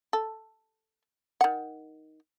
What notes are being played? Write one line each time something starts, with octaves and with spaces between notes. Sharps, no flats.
A4
D#3 F#5